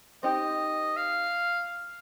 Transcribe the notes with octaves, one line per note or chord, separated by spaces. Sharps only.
C4 D#4 G4 D#5
F5